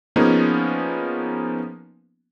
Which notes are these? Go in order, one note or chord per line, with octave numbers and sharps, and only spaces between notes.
F3 A#3 B3 C#4 D#4 G#4